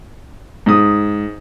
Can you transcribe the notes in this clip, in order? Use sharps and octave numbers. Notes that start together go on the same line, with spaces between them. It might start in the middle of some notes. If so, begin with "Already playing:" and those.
G#2 D#6